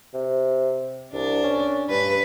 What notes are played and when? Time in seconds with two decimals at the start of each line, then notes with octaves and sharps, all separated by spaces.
0.14 C3
1.14 C2 D4
1.43 C#4
1.90 G2 B4